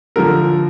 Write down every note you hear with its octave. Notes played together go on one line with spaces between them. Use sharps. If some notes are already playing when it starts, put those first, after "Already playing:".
D3 F3 A#4